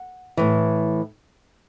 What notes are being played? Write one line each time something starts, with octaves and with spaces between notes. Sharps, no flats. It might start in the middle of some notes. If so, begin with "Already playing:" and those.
Already playing: F#5
A2 E3